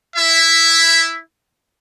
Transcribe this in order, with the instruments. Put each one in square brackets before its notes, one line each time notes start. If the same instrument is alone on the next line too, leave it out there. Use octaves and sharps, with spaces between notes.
[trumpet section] E4 E5